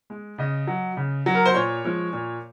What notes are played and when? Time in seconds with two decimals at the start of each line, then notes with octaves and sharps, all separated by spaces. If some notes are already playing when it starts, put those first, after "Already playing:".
0.10 G#3
0.38 C#3 D#5
0.67 F#3
0.97 C#3
1.26 F#3
1.35 A#4
1.46 C5
1.54 A#2 C#5
1.84 F3 G#3
2.13 A#2